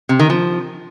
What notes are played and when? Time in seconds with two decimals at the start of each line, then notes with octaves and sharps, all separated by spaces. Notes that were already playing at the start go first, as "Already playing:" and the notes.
0.09 C3
0.19 D#3
0.30 F3